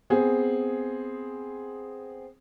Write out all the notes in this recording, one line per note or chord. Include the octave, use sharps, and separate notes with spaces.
B3 C4 G#4